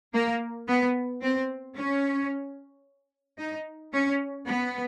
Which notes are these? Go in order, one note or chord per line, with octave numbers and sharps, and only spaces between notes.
A#3
B3
C4
C#4
D#4
C#4
B3